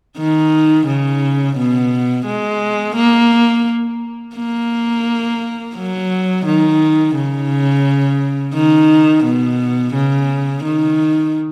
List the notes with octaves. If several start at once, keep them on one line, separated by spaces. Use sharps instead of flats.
D#3
C#3
B2
G#3
A#3
A#3
F#3
D#3
C#3
D#3
B2
C#3
D#3